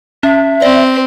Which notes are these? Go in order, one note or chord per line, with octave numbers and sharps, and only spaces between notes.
C#4 E5
C4 D5